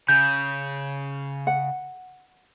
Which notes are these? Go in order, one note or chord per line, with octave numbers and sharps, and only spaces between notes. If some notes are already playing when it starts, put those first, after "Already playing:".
C#3 G6
F#5